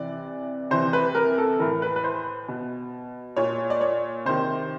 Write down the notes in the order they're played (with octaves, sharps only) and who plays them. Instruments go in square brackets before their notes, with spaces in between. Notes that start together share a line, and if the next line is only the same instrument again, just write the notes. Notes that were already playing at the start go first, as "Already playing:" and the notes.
Already playing: [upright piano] C3 E3 D5
C3 E3 C5
B4
A#4
A4
A2 E3 A#4
B4
B4
C5
B2
A#2 C#5
D5
C#5
C3 D#3 C5